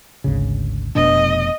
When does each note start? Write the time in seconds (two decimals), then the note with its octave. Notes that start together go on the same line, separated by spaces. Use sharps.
0.24 G#1 D2 C#3
0.95 F1 B2 D4 D#5